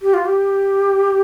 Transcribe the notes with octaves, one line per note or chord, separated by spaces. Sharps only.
G4
F4
G4